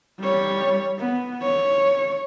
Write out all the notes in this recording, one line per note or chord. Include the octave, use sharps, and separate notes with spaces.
G3 C#5
B3
C#5